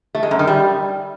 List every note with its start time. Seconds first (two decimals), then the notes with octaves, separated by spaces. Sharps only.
0.15 A3
0.23 G#3
0.31 F#2
0.39 D#3
0.47 G3